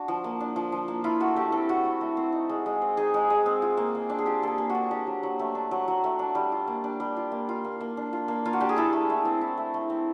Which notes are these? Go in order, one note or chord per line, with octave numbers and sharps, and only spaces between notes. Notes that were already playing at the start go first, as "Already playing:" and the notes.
Already playing: D4 F#4
F3
A#3
D4
F3
F3
A#3
E4 F4
A3 F#4
A3 G4
C4 A4
E4 F#4
A3
A3
C4
D#4
G#3
G#3
C4
D#4 G#4
G#3
G#3
C4
F4
A#3
A#3
D4
G#4
F4 G4
A#3 G#4 A4
A#3
F#4
D4
D4 G4
F#3
F#3
A3
D4
F#3
F#3
A3
D4
G3
F4
A#3
D4
G3
F4
A#3
F4
A#3
A#3
D4
F4
A#3
A#3 F4
F#4
D4 G4
G#4
E4 A4
A3
A3
C4
E4
A3
A3
C4